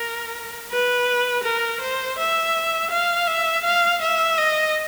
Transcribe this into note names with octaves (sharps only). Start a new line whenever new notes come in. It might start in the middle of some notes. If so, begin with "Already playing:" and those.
Already playing: A#4
B4
A#4
C5
E5
F5
E5
F5
E5
D#5